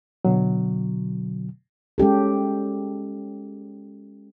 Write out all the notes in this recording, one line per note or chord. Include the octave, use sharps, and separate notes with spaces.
B2 D3 F#3
G#3 C#4 G4 A4